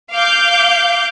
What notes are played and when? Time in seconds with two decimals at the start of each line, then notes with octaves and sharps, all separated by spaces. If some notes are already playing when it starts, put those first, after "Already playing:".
0.13 F5 D6 G6